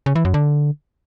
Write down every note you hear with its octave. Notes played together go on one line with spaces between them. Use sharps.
C#3
E3
F#2
D3